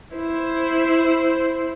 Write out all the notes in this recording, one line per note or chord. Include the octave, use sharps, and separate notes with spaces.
E4 C5